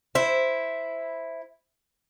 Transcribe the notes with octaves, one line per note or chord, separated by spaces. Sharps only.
E4 C5